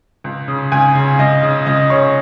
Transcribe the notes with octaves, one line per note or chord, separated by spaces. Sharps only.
C#2
C#3
C#2 G#5
C#3
C#2 D#5
C#3
C#2 D#5
C#3 C#5